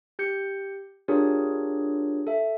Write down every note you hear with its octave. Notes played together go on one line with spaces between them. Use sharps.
G4 G6 C#7
D4 F4 G4 G#4 A#4 C#5
A4 E5